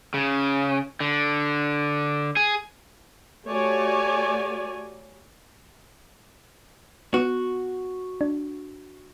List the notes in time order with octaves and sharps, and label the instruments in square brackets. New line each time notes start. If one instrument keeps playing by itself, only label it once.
[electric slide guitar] C#3
D3
G#4
[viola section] A3 F#4 G4 C#5 D5 G#5
[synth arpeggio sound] B3 [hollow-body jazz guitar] F#4
[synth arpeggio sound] D4